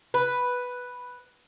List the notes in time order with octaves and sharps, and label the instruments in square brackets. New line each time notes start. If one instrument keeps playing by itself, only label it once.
[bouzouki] B4